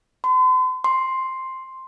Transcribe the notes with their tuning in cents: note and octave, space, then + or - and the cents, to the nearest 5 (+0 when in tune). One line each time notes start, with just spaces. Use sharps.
C6 -45
C6 +5